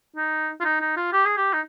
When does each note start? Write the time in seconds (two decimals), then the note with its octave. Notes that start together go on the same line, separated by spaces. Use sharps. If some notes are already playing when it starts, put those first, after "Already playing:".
0.16 D#4
0.60 F4
0.65 D#4
0.81 D#4
0.97 F4
1.13 G4
1.26 G#4
1.37 G4
1.54 D#4